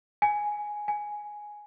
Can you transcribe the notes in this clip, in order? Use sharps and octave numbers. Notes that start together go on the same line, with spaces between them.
G#5
G#5